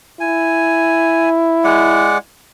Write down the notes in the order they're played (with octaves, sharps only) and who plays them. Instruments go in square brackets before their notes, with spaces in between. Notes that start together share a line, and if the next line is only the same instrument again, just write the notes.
[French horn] E4 [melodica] G#5
[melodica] G#3 D5 F#5